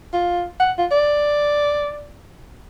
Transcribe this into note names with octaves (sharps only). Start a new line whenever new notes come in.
F4
F#5
F4
D5